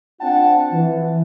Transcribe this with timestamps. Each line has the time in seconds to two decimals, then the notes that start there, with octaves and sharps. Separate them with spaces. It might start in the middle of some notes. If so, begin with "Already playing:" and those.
0.20 C4 D4 F4 F#5 G5 A5
0.72 E3